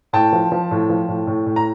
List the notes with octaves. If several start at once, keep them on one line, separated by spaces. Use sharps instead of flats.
A2 G5 A5
F3
F3
A2
F3
A2
A2
A2
A#5